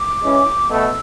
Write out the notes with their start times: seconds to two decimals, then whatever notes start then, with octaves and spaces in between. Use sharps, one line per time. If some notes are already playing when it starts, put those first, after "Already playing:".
Already playing: D6
0.22 E3 G#3 C#4
0.70 B2 A3 E6